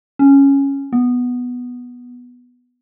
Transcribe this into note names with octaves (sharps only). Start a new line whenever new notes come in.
C#4
B3